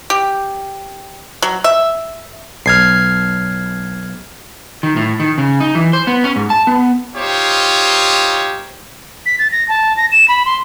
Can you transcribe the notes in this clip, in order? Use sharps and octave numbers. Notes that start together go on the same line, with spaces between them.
G4
F#3
E5
B1 F6 G#6 C7
D#3
A2
D#3
C#3
D#4
E3
C5
B3
C#4
G#2
A5
B3
D#4 F4 G4 C5 C#5
B6
A6
A#6
A5
A#6
E7
B5
C6